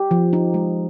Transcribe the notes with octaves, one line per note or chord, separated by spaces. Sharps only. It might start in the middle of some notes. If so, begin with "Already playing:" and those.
Already playing: G4
F3
D#4
G#3